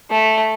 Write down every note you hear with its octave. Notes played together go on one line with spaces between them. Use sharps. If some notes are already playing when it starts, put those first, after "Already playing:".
A3